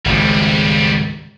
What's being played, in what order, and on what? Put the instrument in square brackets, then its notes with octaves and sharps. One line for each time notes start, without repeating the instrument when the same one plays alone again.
[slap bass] G#1 C#2 G#2 [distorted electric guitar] F3 G3